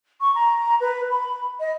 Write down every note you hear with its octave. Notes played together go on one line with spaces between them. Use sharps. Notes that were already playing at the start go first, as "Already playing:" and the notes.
C#6
A#5
B4
B5
D#5